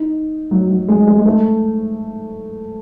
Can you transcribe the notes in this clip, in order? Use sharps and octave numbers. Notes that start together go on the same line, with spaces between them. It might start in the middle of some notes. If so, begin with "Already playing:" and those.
Already playing: D#4
F#3
F#3
G#3
G#3
G#3
A3